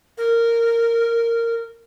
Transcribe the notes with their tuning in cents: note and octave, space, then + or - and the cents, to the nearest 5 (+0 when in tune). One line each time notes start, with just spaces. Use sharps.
A#4 -10